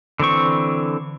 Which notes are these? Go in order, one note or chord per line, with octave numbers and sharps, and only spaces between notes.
D3 E3 C4 C#6